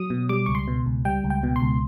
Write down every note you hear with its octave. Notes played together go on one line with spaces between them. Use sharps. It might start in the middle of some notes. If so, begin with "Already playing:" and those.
Already playing: F#3 D#6
B2
G3 D6
C#2 C#6
C6
B2
C#2
G3 G5
C#2
G5
B2
C6
C#2